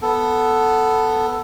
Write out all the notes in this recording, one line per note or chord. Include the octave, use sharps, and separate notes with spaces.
B3 A4